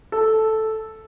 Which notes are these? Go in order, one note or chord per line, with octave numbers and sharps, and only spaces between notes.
A4